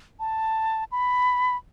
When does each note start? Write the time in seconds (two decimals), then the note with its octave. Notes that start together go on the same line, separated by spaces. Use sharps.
0.20 A5
0.92 B5